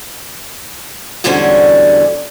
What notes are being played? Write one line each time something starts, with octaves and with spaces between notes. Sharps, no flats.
E2 G#2 D3 G3 C#4 F#4